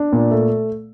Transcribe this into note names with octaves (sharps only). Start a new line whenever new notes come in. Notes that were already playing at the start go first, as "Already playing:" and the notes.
Already playing: D4
A#2
A3